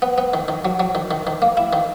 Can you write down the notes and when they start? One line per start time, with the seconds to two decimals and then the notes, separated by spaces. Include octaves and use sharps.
0.02 B3
0.18 B3
0.34 D#3
0.48 D#3
0.65 F#3
0.80 F#3
0.95 D#3
1.11 D#3
1.27 D#3
1.42 A#3
1.57 E4
1.73 D#3